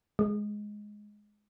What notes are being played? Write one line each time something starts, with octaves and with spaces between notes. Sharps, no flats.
G#3